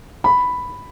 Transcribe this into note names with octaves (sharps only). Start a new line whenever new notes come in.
B5